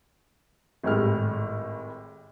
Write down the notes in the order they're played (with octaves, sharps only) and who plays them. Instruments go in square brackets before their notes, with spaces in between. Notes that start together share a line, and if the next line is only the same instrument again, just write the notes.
[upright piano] G#1 A2 G3 G#3 F6